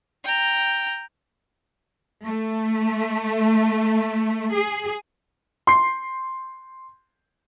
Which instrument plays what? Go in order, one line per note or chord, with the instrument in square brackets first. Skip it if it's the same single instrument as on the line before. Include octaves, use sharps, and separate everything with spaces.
[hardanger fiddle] G5 A#5
[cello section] A3
G#4
[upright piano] C6 C7